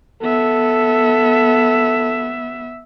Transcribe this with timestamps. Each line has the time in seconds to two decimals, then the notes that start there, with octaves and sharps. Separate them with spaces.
0.22 B3 A4 E5